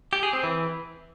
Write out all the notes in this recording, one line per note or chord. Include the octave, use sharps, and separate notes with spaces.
G4
G#4
C4
E3